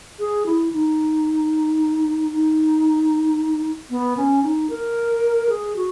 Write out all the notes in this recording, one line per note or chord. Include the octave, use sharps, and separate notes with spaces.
G#4
E4
D#4
D#4
B3
C#4
D#4
A#4
G#4
F#4